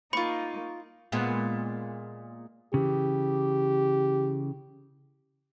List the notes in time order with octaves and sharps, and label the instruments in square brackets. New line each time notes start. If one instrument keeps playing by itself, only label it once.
[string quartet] A#3 D#4 [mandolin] F4 C#6 [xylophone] B5
[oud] A#2 G#3 B3
[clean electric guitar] C#3 E3 [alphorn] G4